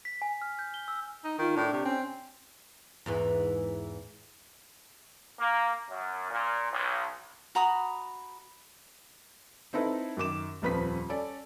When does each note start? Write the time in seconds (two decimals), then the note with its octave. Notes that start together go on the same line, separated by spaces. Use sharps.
0.05 B6
0.22 G#5
0.42 F6
0.59 G6
0.74 G7
0.88 E6
1.24 D#4
1.38 D#3 F4
1.56 A2 D4
1.73 C3
1.85 C4 C#4
3.06 E2 G#2 E3
5.39 A#3
5.89 F#2
6.30 A#2
6.70 B1
7.55 F#4 A#5 B5 D#6
9.73 C4 D#4 E4 A4 B4
10.17 F#2 D#3 D6 E7
10.62 D#1 F2 F3 B4 C5 B6
11.09 C#4 A4 D5